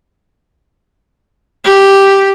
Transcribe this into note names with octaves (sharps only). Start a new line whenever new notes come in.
G4